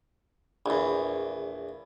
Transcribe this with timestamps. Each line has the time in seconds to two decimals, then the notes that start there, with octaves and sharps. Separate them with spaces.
0.66 A#1 E2